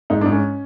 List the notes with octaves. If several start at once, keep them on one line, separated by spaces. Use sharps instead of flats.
G#2 D#4
G#2 D4
C#4